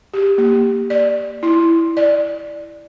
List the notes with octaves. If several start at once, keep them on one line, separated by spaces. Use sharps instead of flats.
G4
A#3
D5
E4
D5